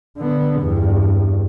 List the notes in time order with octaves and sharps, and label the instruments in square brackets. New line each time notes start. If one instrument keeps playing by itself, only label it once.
[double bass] D3 B3
E2 G2